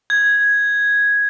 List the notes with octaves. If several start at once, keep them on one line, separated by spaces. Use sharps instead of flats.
G#6